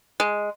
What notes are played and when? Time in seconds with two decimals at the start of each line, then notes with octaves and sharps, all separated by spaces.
0.20 G#3